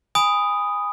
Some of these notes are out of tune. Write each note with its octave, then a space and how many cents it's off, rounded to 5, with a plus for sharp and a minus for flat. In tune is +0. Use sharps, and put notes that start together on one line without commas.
G#5 -25 B5 +10 D#6 +0